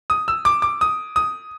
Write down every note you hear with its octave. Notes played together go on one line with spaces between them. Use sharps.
D#6
E6
D6
D6
D#6
D#6